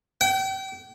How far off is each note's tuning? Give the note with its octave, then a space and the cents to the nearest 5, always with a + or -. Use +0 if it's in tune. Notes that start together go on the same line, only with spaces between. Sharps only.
G5 -35